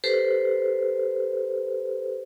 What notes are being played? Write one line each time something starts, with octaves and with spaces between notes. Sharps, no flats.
G4 A4 B4 C5